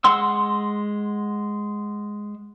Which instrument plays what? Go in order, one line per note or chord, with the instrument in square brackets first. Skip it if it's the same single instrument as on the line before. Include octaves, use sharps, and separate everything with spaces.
[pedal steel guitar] G#3 F#5 C6 E6